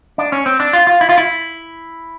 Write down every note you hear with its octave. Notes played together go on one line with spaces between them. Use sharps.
D4
C#4
C4
D4
F4
F4
E4
F4
E4